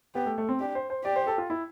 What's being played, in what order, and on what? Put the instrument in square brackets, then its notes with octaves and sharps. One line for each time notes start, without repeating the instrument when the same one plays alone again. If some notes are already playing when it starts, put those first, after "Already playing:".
[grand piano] B3 [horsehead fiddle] G4
[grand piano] A3
A3
C4
[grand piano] D4 [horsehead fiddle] G4
[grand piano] C5
C5
[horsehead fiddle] G4 [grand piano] D5
[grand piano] C5
A4
F4
E4